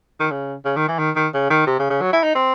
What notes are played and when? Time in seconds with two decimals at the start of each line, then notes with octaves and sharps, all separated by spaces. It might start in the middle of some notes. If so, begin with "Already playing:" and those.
0.20 D#3
0.31 C#3
0.65 C#3
0.76 D#3
0.88 E3
0.99 D#3
1.16 D#3
1.34 C#3
1.50 D#3
1.67 C3
1.79 C#3
1.90 C#3
2.01 F#3
2.13 E4
2.23 D#4
2.35 C4